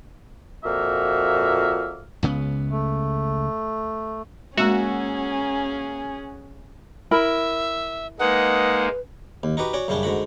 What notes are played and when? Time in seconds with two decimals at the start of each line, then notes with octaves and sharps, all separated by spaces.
0.64 F2 A#2 A#3 F#4 E5 F6
2.23 C#2 C#3 B3
2.70 A3
4.57 G#3 A#3 C#4 F#4 G#4 E6 E7
7.11 E4 A#4 E5 B5
8.19 G#3 A#3 D#4 B4 F#5
9.43 D#2
9.57 D#4 F#4 G4 B4
9.73 C#4 F#4 D5
9.88 F#2 C#3 G3 C#4 D4
10.03 G#2 D3 F#4 B5